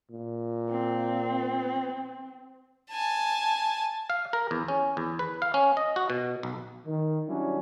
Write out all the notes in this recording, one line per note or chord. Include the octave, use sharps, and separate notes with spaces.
A#2
C4
G#5 A5
F5
A#4
E2
C#4
E2
B4
F5
C#4
D#5
F#4
B2
B1
D#3
F#3 G3 C#4 D4 E4